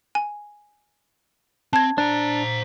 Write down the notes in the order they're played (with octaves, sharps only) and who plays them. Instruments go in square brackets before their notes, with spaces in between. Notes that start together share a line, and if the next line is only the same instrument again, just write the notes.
[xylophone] G#5
[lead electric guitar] C4 [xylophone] A5 G#6
[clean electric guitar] D4 [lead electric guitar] C5 A#5